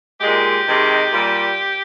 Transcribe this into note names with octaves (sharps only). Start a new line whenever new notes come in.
A#2 G#3 G4
C3 D#3 G#3
A#2 G3